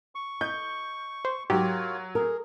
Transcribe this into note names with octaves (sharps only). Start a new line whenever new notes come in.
C#6
D#5 G6
C5
G#2 F#3 F4 G4 A#4 C#5
G#4 A#4